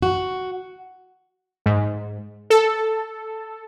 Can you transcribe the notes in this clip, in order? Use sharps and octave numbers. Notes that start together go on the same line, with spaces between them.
F#4
G#2
A4